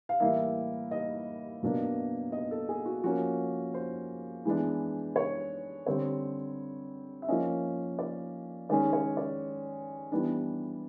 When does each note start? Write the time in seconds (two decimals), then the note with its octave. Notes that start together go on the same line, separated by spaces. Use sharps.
0.09 F5
0.20 A2 E3 G3 A#3 E5
0.91 D#5
1.63 B2 F#3 A#3 D4
2.32 D#5
2.51 A4
2.69 G#4
2.85 F#4
3.04 F3 A#3 C#4 F#4
3.74 C5
4.45 E3 G#3 B3 D4
5.16 C#5
5.87 D3 G3 C4 C#5
7.22 E5
7.28 F3 A#3 C#4 D#5
7.99 D5
8.69 D#3 G#3 C#4 D5
8.93 C#5
9.17 D5
10.12 E3 G3 B3 D4